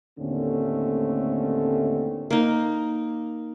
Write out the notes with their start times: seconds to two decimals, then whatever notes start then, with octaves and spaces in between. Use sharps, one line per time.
0.19 D#2 A2 D3 A3 C4 C#4
2.30 A#3 D#4